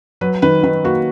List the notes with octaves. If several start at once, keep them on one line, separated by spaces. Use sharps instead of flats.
F#3 B4
D#3 B4
D#3 B4
A#3 F#4